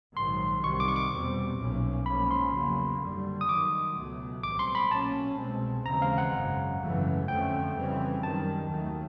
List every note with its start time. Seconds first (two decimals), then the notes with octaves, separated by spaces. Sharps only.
0.16 A#1 G#2 D#3 F#3 C6
0.64 C2 C3 D#3 C#6
0.80 D6
0.88 C#6
0.96 D6
1.11 E2 B2 G3 C4
1.59 B1 A#2 F3 A#3 C#4
2.06 G#2 F3 A#3 C#4 B5
2.31 C6
2.54 E2 C#3 F#3 A#3
3.01 F#1 F#2 D3 G3
3.41 D#6
3.49 G2 D#3 F#3 D6
3.97 C#2 B2 F#3 A3
4.43 B1 A2 E3 G3 C4 D6
4.59 C6
4.75 B5
4.91 B1 A#2 F#3 A#3 C#4 A5
5.39 C2 B2 G#3 C4
5.86 D#2 C#3 E3 G#3 C4 A#5
6.02 F5
6.18 F#5
6.34 G#1 F#2 C#3
6.81 G#1 F#2 C#3 E3 A3
7.28 F2 D3 F3 A3 C#4 G5
7.76 F2 C#3 E3 G3 C4
8.23 F#2 D#3 G3 A5
8.71 D#2 D#3 F#3 A3